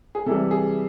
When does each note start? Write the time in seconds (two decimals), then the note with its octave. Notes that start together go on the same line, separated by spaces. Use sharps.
0.15 G#4
0.26 C3 E3 G3 A4
0.51 G#4